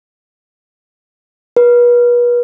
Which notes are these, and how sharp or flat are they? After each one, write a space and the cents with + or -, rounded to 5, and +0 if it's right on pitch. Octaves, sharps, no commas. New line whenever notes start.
B4 -40